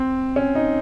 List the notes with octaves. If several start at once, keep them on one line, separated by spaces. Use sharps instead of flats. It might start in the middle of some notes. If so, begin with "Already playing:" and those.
Already playing: C4
C#4
D#4